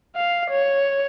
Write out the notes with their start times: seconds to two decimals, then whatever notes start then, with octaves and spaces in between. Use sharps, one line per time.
0.16 F5
0.50 C#5